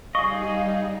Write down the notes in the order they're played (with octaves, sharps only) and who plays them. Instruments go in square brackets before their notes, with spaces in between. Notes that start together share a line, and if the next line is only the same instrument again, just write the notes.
[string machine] G3 D#4 [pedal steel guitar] G#4 D#5 [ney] F5 [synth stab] C#6